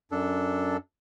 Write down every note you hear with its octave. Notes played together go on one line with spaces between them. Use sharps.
F#2 D4 A4